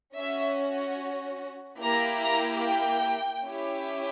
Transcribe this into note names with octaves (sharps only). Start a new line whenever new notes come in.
C#4 F#4 E5
A#3 E4 G4 A#5
A#5
G5
C#4 E4 G4